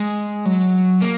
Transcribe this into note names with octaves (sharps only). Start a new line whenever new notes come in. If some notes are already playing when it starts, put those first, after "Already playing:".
Already playing: G#3
F#3
A#3